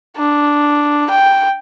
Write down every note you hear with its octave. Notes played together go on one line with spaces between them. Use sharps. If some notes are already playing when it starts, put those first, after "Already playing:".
D4
G5